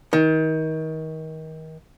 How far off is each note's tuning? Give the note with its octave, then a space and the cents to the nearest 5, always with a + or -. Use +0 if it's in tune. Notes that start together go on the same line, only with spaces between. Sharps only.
D#3 +30